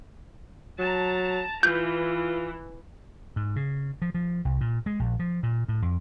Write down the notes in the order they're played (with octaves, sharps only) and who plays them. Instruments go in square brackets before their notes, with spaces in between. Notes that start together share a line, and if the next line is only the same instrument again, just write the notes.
[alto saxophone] F#3 [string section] A5 A#5
[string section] E3 [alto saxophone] F4 [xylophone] G6
[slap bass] G#2
C#3
F3
F3
C2
A#2
G#3
A#1
F3
A#2
A2
F2